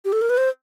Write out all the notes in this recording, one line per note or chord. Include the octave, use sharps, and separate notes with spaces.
G4
A4
A#4
B4
C5